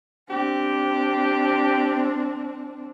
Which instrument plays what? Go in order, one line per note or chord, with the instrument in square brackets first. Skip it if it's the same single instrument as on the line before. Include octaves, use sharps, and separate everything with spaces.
[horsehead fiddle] C4 D4 [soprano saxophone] G4